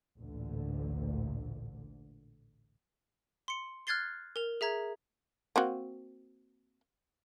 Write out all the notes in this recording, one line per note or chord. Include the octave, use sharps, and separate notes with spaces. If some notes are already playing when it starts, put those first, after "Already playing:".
A1 D2 A#2 D3
C6 C#7
F6 F#6 G#6 A6 C7 G7
A#4 F7
G#4 E5 A#5 G#6
A#3 C4 F#4